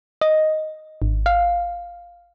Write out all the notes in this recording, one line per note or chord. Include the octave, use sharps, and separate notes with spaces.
D#5
G#1
F5